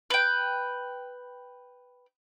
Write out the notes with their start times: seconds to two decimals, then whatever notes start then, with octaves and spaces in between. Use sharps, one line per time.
0.10 B4 G5